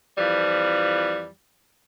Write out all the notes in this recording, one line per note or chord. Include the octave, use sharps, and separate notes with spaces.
F2 E3 F3 G3